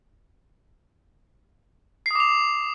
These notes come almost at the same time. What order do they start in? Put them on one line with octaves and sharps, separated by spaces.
C7 D#6 D6 F7